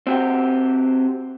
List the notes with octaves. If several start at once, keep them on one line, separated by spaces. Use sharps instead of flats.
C4 F#4 G4